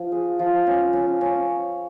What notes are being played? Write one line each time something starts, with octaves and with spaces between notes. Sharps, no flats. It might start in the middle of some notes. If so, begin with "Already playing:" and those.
Already playing: F3
G#4
F3
C#4
C#4
C#4